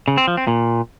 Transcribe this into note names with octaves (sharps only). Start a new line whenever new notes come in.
C#3
C4
F3
C4
A#2